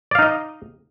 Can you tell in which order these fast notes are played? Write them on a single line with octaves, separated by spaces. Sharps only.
D5 F5 D#4 D#5